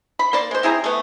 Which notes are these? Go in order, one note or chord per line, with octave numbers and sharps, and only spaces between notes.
B5
A#3 C5 D5
G#3 C5
C4 E4 G#4 A#5
A3 B3